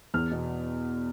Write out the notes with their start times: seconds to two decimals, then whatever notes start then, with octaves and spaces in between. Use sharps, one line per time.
0.14 E2 F6
0.31 B2